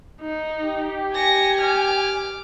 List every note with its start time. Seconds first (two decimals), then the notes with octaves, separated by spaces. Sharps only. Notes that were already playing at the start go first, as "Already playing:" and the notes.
0.22 D#4
0.63 G4
1.14 G#5 A#6 C#7
1.61 D6 F6